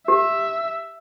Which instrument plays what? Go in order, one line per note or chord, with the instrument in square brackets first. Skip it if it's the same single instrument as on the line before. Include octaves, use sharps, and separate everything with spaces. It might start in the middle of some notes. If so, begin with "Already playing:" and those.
[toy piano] G4 [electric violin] E5